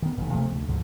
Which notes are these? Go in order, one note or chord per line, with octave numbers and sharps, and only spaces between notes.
D#3 B3
F1 B1 A#2 E3
C3 F3 A3 A#3
D2
C#2 G#2 D3 F3